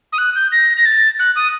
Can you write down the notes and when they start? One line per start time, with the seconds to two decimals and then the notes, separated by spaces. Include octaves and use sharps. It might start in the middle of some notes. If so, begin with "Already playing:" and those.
0.13 D#6
0.18 F#6
0.35 G6
0.52 A#6
0.77 A#6
0.86 A6
1.19 F#6
1.36 D#6